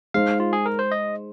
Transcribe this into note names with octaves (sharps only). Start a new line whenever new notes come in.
G#3 D#4 C5 F5
F4
G#4
A#4
C5
D#5